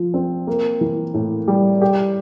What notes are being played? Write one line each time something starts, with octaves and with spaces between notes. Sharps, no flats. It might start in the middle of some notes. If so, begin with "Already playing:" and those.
Already playing: F3
C4
A#3
E3
A2
G3
G4